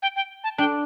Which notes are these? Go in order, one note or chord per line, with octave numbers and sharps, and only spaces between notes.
G5
G5
A5
D4 G5